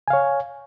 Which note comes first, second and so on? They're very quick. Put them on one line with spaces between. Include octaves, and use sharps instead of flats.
G#5 F5 C#5